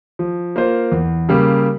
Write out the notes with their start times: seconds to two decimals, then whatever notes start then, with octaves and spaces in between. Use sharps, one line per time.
0.19 F3
0.56 A#3 F4 C5
0.92 E2
1.29 C#3 G3 A#3